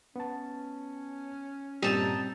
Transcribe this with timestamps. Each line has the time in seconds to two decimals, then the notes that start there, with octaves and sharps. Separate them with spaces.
0.16 B3 C#4 A5
1.83 G2 A#2 G3 C4 D#4 G4 A5